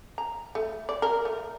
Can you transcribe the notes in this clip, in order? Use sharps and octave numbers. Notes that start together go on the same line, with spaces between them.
A#5
A3
D5
A#4
A3